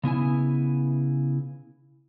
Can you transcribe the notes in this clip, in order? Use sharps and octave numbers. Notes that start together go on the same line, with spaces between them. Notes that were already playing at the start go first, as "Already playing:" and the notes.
C#3 B3 E4 G#5